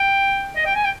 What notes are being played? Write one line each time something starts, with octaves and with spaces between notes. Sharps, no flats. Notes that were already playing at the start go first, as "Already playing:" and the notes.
Already playing: G5
D#5
G5
G#5
G5